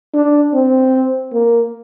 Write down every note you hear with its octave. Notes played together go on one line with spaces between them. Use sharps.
D4
C4
A#3